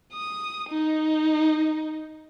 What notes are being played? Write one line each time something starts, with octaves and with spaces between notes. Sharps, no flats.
D#6
D#4